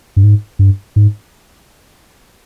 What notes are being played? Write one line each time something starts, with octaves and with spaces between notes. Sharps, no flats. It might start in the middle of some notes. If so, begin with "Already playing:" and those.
G2
G#2
G2
G#2